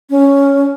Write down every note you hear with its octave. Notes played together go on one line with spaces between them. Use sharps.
C#4